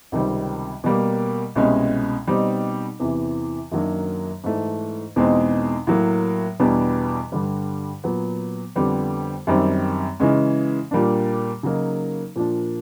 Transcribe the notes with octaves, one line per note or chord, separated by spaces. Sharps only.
C#2 C3 D#3 G3 C4
B2 G3 A#3
C2 B2 G#3 C#4
B2 G3 C4 D#4
E2 C3 E3
F#2 D#3 F#3 A#3 D4
G#2 E3 A3
E2 B2 G#3 C4 D#4
A2 F#3 A#3
E2 B2 G3 B3 D4
G2 D3 G3
A#2 F#3 B3
F2 D3 G3 B3
F#2 D#3 G3 C4
C#3 E3 G#3 C#4
A#2 G3 A#3 D4
C#3 F#3 A#3 D#4
A#2 F3 A#3 D4